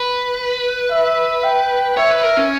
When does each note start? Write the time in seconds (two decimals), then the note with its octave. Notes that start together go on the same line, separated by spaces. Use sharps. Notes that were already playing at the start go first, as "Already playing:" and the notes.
Already playing: B4
0.91 E5
1.44 G5
1.97 C#5 E5
2.10 B4
2.23 A#4
2.37 C#4